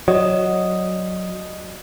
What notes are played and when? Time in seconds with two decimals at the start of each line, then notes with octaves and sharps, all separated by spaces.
0.08 F#3 D5 D#5 D#6